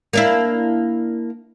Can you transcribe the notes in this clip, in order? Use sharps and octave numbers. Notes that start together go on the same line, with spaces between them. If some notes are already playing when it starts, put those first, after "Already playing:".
A#3 D4 E4